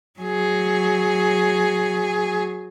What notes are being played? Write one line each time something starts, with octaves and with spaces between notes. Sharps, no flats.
F#3 G#4